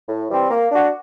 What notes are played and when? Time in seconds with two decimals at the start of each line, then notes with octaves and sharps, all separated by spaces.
0.09 A2
0.30 E3 G3 C4
0.50 A#3
0.72 D4 F#4